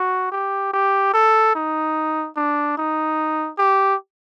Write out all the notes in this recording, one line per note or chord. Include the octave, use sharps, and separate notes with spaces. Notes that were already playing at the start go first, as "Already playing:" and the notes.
Already playing: F#4
G4
G4
A4
D#4
D4
D#4
G4